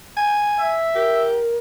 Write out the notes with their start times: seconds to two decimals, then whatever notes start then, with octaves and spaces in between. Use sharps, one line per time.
0.17 G#5
0.60 E5
0.95 G4 A#4